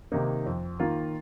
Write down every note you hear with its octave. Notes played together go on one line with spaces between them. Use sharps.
C3 D#3 A#3 D#4
F2
D#3 A#3 F4